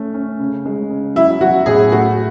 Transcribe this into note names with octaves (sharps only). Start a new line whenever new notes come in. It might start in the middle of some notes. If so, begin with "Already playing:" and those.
Already playing: A3 C#4
C#4
C#3
G#3
C#3
F#3 E4
F#3 F#4
A2 G#4
A3 F#4